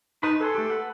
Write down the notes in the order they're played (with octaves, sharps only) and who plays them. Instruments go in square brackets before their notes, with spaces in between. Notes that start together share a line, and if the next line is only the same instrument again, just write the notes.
[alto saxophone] D#4 [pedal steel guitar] B4 A5 B5
[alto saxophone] A4 [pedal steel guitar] B4 G#5 C6
[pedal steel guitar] A3 G4
B4 F#5